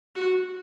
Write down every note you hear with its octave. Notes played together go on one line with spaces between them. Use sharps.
F#4